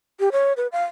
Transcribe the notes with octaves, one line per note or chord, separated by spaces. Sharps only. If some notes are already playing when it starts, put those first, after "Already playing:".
G4
C#5
B4
F5